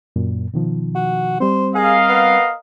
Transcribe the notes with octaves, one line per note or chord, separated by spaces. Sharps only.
F#2 A#2
B2 D#3 F3
F#4
G3 C4 C5
G#4 A#4 D#5 F5
B3